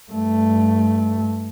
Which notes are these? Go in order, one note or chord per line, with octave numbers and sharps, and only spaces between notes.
G2 A3